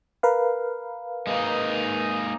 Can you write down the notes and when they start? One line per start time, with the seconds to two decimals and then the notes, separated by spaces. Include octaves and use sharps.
0.23 A#4 B4 F5
1.27 G#3 A#3 D#4